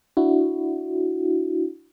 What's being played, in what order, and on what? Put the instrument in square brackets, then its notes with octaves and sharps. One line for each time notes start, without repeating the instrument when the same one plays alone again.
[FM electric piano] D4 E4 F#4